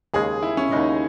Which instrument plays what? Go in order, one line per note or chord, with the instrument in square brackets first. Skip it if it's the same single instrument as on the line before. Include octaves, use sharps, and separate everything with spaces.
[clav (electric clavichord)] D#2 C#3 G#3 [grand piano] G#4
[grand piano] E4
C#4
[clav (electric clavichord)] D#2 C#3 G#3 [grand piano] D#4